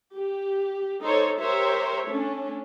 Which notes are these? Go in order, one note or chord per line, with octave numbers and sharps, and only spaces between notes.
G4
D#4 A4 C5 C#5
G4 A#4 C5 C#5 E5
A3 C#4 D4